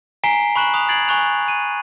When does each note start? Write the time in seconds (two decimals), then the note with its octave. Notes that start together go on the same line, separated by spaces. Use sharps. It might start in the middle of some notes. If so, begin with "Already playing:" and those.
0.24 G#5 A#5 B6 C7 D7 G7
0.56 B5 C#6 F#6 E7 F#7
0.74 D#6 F#6 F7
0.89 G#6 A6 C7 D7 F#7
1.08 G#5 C#6 F#6 F7
1.48 D#7